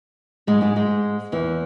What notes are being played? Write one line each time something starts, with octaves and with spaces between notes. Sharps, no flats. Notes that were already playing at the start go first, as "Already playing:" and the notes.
G#2 G#3
G#2 G#3
G#2 G#3
E2 E3